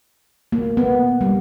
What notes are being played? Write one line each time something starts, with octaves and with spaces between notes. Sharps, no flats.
A#3
B3
G3